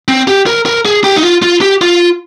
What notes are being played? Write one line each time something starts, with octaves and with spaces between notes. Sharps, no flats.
C4
G4
A#4
A#4
G#4
G4
D#4
F4
F4
G4
F4